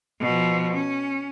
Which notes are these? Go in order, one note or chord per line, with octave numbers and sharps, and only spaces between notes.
B2 F3
C#4